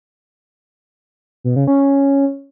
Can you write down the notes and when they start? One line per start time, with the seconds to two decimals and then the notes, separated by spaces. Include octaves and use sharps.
1.44 B2
1.56 C#3
1.68 C#4